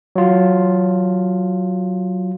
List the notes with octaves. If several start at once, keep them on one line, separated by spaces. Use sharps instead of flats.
F#3 F4